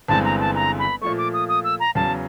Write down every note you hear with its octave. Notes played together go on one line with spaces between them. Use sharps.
G1 G2 E3 G#3 C4 A5
A#5
A5
A#5
B5
A#2 F3 A3 C#6
D6
D#6
D#6
E6
A#5
E2 C#3 F#3 A5